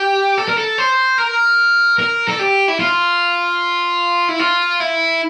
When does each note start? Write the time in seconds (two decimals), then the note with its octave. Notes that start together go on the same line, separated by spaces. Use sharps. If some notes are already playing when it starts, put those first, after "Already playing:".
Already playing: G4
0.38 A4
0.48 A#4
0.58 A4
0.78 C5
1.18 A#4
1.99 A#4
2.28 A4
2.39 G4
2.68 E4
2.79 F4
4.29 E4
4.39 F4
4.80 E4